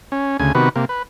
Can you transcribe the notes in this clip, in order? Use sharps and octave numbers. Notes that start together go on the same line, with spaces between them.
C#4
D2 C#3 G#5
C3 D#3 B3 F#4 B4
C3 A#3
B4